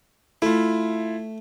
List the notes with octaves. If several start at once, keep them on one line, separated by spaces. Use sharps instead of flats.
A3 E4 F4